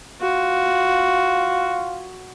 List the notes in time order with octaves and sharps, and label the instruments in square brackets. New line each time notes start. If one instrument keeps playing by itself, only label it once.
[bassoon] F4 [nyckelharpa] F#4